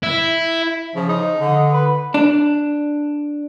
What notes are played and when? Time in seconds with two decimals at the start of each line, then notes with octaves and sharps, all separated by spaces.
0.03 E4
0.95 C#3 F3
1.09 D#4
1.41 D3
1.72 B4
2.14 D4